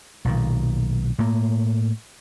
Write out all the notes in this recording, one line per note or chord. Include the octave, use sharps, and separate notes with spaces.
B1 A#2 D#3
A2 A#3